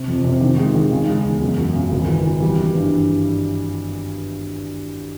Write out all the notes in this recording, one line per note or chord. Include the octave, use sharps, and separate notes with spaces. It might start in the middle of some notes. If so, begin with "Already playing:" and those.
Already playing: C3
F2
C3
D#3
G#3
D#3
C#3
G#3
E2
F#2
F#2
C#3
G#1
E3
E3
G3
E3
G2